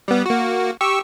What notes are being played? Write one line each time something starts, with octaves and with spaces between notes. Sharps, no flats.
G3 B3
A#3 F#4
G4 C#6 E6